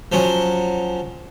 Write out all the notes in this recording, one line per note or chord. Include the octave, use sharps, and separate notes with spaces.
F3 F#3 C#4